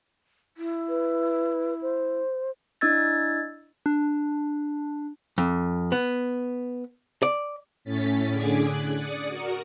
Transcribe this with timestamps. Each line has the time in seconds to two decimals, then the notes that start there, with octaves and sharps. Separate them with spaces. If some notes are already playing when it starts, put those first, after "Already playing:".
0.57 E4
0.89 B4
1.82 C5
2.81 D4 E4 D#5 E6 G#6 A6
3.86 D4
5.38 F2
5.92 B3
7.23 D5
7.84 A2 C#4 A6 B6
8.31 D3 G#4 D6 G#6
8.65 F#6
8.96 D5 D#6 C#7
9.27 F#4 A#4